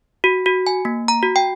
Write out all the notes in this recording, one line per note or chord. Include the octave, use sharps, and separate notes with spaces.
F#4
F#4
G#5
A#3
A#5
F#4
G5